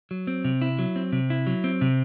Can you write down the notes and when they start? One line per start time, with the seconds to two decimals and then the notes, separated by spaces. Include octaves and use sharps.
0.11 F#3
0.27 C4
0.45 C3
0.62 E4
0.79 F#3
0.96 C4
1.12 C3
1.30 E4
1.47 F#3
1.64 C4
1.81 C3